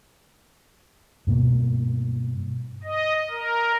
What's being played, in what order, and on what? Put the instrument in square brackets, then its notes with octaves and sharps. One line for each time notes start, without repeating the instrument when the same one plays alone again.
[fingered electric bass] G2 B2 A#3
[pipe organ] D#5
A#4